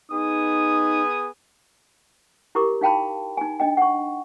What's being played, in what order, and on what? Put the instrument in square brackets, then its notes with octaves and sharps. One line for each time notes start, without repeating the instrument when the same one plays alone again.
[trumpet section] B3 G#4 D#6 [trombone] D#4
[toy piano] E4 G4 A#4 C#6 D6
D#4 F5 G5 A5 B5
D#4 G#5
D4 D#5 G5
F#5 C#6